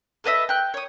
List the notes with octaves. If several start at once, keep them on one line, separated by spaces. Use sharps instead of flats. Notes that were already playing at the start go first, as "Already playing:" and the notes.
A4 B4 D#5 E5
G5 F#6
C#5 D#6